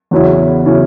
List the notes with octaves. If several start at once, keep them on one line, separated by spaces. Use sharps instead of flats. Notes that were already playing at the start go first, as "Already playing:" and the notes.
E2 C#3 F#3 C#4 E4
C#3 F#3 C#4 E4